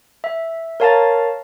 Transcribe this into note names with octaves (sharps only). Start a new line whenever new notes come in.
E5
A#4 C#5 F5 A5 A#5 A6